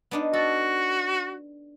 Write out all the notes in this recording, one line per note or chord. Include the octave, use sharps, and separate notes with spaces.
B3 D4 D#4
F#4 A4